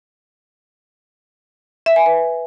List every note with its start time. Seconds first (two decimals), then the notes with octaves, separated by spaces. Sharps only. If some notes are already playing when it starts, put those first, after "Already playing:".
1.86 E5
1.96 G#5
2.06 B4